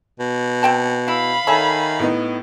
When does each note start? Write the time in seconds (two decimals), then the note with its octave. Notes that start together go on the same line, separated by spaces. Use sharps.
0.20 B2
0.63 C4 G5 A5
1.08 E4 F5 B5
1.47 D#3 A4 C#5 E5 G#5 A5
1.99 A2 B3 D#4